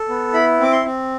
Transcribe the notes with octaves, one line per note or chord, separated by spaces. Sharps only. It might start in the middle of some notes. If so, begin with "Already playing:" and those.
Already playing: A4
B3
E4 B5
C4 D6
C6
C4